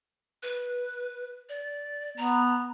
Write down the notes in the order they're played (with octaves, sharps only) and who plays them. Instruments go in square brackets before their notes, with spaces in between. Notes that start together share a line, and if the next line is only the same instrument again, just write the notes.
[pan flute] B4
D5
[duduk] B3 [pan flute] A#5